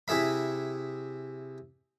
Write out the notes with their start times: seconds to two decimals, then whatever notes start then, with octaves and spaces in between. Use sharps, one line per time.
0.08 C3 E4 G#4 E5 B5